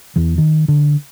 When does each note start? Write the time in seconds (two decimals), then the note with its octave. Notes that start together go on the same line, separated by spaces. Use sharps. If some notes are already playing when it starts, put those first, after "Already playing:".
0.16 E2 E3
0.38 D#3
0.68 D3